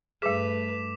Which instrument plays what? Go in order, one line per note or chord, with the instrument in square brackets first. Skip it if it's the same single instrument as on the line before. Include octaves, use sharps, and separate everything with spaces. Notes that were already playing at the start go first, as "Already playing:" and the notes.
[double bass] G2 A3 [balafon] G3 G#4 [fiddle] B4 [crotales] D6 B6 E7